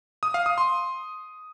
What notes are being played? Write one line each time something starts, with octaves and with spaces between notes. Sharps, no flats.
D#6
F5
D#6
C6